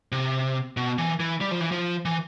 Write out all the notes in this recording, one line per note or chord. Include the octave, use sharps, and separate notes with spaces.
C3
B2
E3
E3
G3
F3
E3
F3
E3